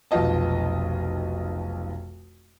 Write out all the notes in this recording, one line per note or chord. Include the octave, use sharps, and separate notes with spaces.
F1 B1 B3 F4 D#5 A5